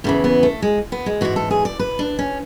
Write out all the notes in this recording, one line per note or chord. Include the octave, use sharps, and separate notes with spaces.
E2 C#3 E3 A3
B3
A3
G#3
B3
G#3
G#2 E3 F#4
A4
G#4
D5
B4
D4
C#4